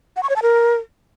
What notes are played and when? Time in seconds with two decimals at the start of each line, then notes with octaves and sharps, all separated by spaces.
0.16 F#5
0.23 C#6
0.29 C#5
0.36 A5
0.42 A#4